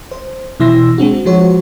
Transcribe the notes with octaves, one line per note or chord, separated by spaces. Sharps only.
C5
B2 E3 E4 C6 E6 A#6
G#3 C4 D4 F#4
F3 G#3 F#4 C5 C#5